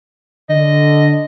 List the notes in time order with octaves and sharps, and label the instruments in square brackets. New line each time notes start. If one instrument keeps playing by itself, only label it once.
[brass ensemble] D3 [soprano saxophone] D#5